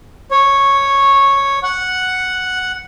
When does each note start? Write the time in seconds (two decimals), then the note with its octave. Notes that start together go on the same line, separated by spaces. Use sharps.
0.31 C#5
1.63 F#5